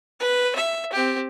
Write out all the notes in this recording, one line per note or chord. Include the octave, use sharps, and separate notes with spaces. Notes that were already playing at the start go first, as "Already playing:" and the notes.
B4
E5
C4 G4